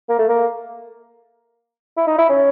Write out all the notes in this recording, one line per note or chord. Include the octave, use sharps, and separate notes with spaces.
A#3
A3
A#3
E4
D#4
E4
C#4